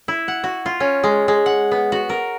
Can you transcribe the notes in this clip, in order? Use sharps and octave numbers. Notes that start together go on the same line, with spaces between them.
E4
F#5
F#4
F4
C#4
G#3
G#3
F#5
B3
F#4
A#4